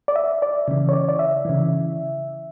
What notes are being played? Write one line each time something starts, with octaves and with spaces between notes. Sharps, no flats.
D5
E5
D5
C#3 E3
C#5
D5
D5
E5
C#3 E3